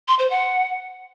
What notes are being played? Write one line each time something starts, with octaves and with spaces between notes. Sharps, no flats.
C6
C5
F#5